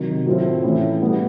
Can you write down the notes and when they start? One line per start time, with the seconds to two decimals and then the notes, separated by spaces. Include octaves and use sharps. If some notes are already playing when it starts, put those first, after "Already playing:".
Already playing: C3 D#3 F#3
0.26 A2 F#3 A3 C4 F4
0.63 A2 E3 A3 C#4 E4
1.01 B2 G3 B3